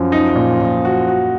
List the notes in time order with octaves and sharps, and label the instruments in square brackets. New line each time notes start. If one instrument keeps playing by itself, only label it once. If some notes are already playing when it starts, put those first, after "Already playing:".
Already playing: [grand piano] F#2 [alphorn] F3
[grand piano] D#4
A#2
A#2
F#4
F#4